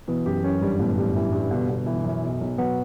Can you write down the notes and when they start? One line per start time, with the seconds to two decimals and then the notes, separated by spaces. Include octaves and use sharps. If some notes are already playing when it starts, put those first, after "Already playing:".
0.08 B2 E3
0.26 F#2 G4
0.44 F#2 C#4
0.62 G2 G3
0.79 G1 A2
0.98 G3
1.16 E3
1.33 G2
1.51 G1 B2
1.70 G1
1.86 E3
2.04 F#2
2.23 B1
2.41 B1
2.58 F#3 B3